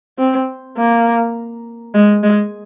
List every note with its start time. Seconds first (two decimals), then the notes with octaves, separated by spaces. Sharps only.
0.18 C4
0.77 A#3
1.94 G#3
2.23 G#3